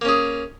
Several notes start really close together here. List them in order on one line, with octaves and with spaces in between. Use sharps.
A#3 C#4 G#4